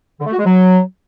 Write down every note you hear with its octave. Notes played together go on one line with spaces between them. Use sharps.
D3
A3
F#4
G#3
F#3